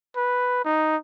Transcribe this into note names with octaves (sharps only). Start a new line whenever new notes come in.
B4
D#4